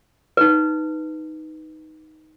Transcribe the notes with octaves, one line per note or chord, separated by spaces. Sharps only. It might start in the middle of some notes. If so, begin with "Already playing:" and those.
D#4 B4